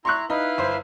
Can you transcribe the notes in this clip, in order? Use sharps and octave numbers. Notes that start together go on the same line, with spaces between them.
E4 A#5 C6 C#6 F#6
D#4 E4 B4 F5
G1 C5